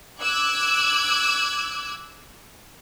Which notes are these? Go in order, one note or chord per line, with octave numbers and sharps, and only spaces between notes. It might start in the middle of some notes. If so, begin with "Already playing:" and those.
D6 E6 F#6 G#6